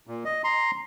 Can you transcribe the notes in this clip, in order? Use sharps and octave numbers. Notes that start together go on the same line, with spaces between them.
A#2
D#5
A#5 C6